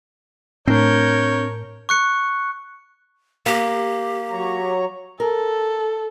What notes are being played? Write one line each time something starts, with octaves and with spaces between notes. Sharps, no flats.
A2 C4 D4 A#4 C#5 G6
C#6 F#6 C#7
A#3 G4
F#3 C#5 A#5
A4 A#4